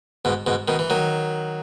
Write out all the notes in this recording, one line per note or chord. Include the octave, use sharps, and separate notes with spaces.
G#2 B2
G#2 B2
B2 D#3
E3
D#3 F#3